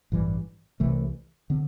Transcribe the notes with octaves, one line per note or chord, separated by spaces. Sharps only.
A1 G2 E3 G3
C2 C3 E3 A3
D3 C4